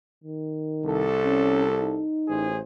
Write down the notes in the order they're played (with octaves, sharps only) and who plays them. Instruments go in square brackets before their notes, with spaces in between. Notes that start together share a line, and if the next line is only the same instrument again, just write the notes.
[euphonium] D#3
[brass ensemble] C2 A4
[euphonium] C#4
D#4
[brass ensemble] A1 G#4 C5